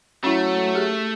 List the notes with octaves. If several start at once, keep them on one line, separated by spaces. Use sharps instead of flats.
F#3 A3 C#4 E4
G4 G#4